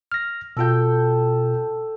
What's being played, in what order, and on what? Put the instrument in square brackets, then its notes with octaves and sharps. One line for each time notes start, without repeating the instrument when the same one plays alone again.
[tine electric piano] F6 A#6
[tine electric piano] B2 F4 G6 [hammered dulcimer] A4 G5